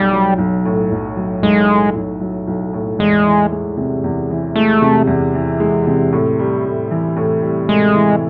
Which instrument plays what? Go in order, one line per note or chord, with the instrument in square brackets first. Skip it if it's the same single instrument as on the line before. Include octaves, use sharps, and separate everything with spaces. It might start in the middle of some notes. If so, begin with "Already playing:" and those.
Already playing: [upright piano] B1 [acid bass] G3
[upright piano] F#3
B1
A2
B1
F#3
[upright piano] B1 [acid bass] G#3
[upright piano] A2
B1
F#3
B1
A2
[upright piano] E2 [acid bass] G#3
[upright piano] E3
G#3
C3
E2
E3
[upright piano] G#3 [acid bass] A3
[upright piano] C3
E2
E3
G#3
C3
A2
G3
A2
E3
A2
G3
[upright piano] A2 [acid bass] G#3
[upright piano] E3